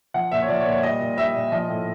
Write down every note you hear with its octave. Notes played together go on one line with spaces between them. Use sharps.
F3 F#5
A#2 E5
C#5
F3 D5
C#5
A#2
C#5
G3 D#5
A#2
G3 E5
A#2
F3 D#5
A2